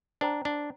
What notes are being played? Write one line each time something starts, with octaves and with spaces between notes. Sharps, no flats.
D4 C5 G5 A#5
D4